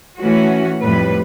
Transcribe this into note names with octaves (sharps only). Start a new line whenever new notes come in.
A2 E3 A3 C#4 F#4
F2 A2 G3 B4